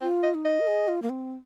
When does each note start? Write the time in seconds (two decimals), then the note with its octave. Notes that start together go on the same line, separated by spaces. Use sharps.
0.01 C4 F4
0.23 D#5
0.34 D#4
0.45 D#5
0.60 A#4
0.67 G#4
0.88 F4
1.02 A#3
1.09 C4